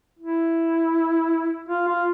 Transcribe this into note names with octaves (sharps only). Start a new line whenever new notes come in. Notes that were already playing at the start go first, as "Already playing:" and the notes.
E4
F4
F4